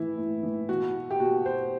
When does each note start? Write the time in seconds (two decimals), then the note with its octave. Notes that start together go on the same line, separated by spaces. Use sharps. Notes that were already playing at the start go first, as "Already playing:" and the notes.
Already playing: A2 E3 E4
0.18 A2
0.43 E3
0.69 B2 F#4
1.11 G4
1.20 B2 F#4
1.46 C5